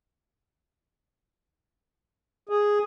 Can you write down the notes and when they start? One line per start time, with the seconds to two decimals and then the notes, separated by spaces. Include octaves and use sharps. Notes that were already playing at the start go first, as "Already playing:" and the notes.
2.49 G#4